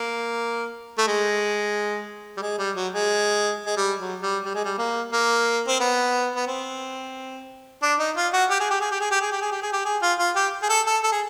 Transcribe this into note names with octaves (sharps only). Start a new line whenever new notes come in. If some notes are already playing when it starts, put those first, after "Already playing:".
Already playing: A#3
A3
G#3
G3
G#3
G3
F#3
G#3
G#3
G3
F#3
G3
G3
G#3
G3
A#3
A#3
C4
B3
B3
C4
D4
D#4
F4
F#4
G4
G#4
G4
G#4
G4
G#4
G4
G#4
G4
G#4
G4
G#4
G4
G#4
F4
F4
G4
G#4
A4
A4
A4
G#4